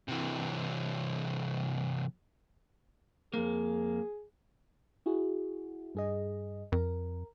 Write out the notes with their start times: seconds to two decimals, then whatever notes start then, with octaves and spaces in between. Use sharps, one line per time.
0.08 C3 E3
3.34 F2 A#3 G#4
5.06 E4 F#4 G#4
5.95 G2 G#4 D#5
6.72 F2 A#4